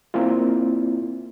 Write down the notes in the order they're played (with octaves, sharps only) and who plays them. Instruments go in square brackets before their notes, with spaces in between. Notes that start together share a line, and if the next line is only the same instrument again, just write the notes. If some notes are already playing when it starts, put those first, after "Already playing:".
[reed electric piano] A#3 C4 E4 F4